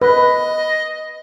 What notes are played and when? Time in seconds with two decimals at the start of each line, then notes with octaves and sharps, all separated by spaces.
0.02 B4 D#5